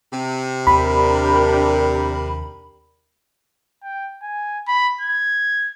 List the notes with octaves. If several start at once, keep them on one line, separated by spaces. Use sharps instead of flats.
C3
D#2 C4 D4 G4 A#4 B5
G5
G#5
B5
G#6